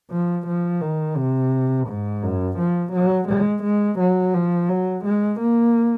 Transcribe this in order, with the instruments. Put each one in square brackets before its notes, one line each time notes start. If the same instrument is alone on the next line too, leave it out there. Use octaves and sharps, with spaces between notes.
[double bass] F3
F3
D#3
C3
G#2
F#2
F3
F#3
G#3
G#3
F#3
F3
F#3
G#3
A#3